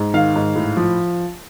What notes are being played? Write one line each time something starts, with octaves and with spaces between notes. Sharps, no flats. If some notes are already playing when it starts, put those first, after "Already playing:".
Already playing: G#2
D#3 F5
G#2
A2
F3